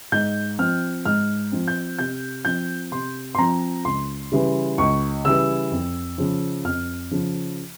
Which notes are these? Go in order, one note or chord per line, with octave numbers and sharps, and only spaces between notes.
G#2 G6
F3 C4 F6
G#2 F6
F3 C4
G6
C3 G6
F3 C4 G6
C3 C6
C6
F3 C4 A#5
C#2 C6
C#3 E3 G3
C#2 C#6
C#3 E3 G3 E6
F2
C#3 F3
F2 F6
C#3 F3